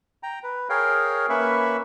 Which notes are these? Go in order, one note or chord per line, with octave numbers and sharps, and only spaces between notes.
G5 A#5
B4
G#4 A#4 C#5 F5 G5
A#3 C#4 B4 E5 B5 C#6